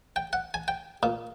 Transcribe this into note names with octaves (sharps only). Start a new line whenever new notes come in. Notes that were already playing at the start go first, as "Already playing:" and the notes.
G5
F#5
G#5
G5
A#2